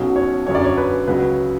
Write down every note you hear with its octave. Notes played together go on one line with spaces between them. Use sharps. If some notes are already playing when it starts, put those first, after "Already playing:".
Already playing: B1 B2 F#3 C#4
C#5
F#2 D3 F#3 C#4 C#5
D5
C#5
B4
C#2 C#3 F#3 B4